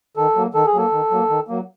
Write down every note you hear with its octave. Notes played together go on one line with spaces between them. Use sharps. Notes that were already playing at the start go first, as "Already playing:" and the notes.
D#3 A4
F#3 A#3
D#3 A4
G#4
F#3 A#3 A4
D#3
F#3 A#3
D#3
F#3 A#3